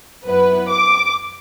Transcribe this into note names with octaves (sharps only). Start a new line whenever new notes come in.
F#2 F#3 B3 E4 B4
D6